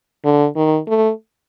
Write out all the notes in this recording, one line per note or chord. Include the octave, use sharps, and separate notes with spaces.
D3
D#3
A3